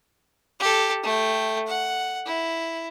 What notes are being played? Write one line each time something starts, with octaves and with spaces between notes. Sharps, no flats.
G4 A4
A3 G5
F#5
E4